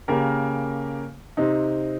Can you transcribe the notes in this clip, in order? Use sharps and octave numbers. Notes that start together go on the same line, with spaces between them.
C#3 A#3 G4 A#4
C3 C4 D#4